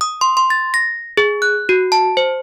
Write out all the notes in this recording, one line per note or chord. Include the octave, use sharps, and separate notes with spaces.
D#6
C6
C6
A6
A#6
G#4
F#6
F#4
A5
C5